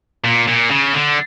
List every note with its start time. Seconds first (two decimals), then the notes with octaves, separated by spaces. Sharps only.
0.24 A#2
0.47 A#2
0.70 C#3
0.94 D3